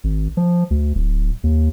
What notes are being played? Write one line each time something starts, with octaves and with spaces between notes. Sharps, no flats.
G#1
F3
D2
D1
D#2